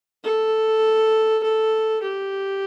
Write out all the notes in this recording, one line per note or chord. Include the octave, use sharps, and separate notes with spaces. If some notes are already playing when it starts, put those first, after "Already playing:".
A4
A4
G4